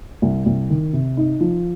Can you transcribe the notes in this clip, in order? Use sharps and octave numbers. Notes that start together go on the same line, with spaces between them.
C2
C2
D#3
C3
D#4
F3